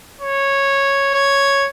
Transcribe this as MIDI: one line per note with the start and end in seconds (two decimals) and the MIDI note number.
0.21 1.10 73
1.14 1.69 73